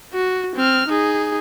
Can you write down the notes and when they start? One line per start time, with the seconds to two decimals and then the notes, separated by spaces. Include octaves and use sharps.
0.13 F#4
0.56 C4 F6
0.89 D#4 G#4